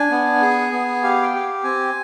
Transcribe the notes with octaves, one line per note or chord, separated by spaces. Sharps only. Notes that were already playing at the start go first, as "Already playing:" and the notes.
Already playing: D4 G#5
B3
G#4
B3
G4 F5
G5
G4
C4 G#5